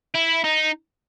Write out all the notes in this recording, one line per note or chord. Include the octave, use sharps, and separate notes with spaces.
E4
D#4